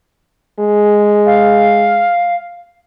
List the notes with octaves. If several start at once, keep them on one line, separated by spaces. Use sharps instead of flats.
G#3
F5